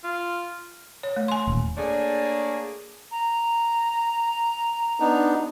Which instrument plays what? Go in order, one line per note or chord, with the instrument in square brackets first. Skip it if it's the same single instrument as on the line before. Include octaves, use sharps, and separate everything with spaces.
[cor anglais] F4
[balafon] C#5
A3
G#5 C6
[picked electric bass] D#1
[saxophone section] A3 A#3 D4 G#4 C#5 D5
[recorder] A#5
[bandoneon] B3 D4 D#4